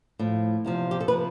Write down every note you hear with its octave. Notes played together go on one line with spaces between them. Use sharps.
A2 F3
E2 C3 F3
G4
A4
C3 F3 B4